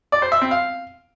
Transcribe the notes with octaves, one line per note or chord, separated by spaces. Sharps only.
D5
C5
E5
C4
F5